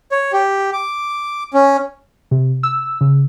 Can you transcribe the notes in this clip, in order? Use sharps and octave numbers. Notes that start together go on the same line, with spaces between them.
C#5
G4
D6
C#4
C3
E6
C#3